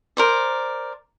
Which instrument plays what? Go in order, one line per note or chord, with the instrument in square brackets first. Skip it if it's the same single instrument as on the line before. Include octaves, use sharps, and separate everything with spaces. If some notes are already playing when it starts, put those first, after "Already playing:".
[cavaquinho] A#4 C5 D5